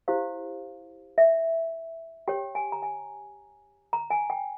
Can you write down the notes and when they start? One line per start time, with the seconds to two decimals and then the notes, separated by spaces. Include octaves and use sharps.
0.08 E4 G4 C5 F5
1.18 E5
2.28 G4 C#5 G5
2.55 G#5
2.72 A#5
2.82 G#5
3.93 A#5
4.10 G#5
4.30 G5